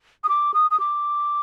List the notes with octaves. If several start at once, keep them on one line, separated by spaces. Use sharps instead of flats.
D#6
D6
D#6
D#6
D6